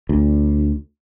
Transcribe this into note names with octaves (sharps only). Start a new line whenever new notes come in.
D2